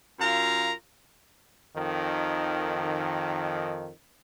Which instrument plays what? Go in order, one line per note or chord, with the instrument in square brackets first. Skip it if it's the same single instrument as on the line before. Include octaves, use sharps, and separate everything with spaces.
[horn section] F#2 F4 A#4 F5 A#5
[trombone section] F2 D#3